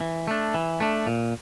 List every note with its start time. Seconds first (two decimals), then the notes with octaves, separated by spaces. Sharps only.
0.01 E3
0.27 A3 D4
0.54 E3
0.80 A3 D4
1.07 A#2